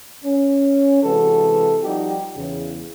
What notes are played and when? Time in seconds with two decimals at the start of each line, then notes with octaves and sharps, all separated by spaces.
0.24 C#4
1.03 C3 E3 G#3 F#4 A4 B4
1.83 F3 G3 D#4 F#4 G4
2.36 E2 C#3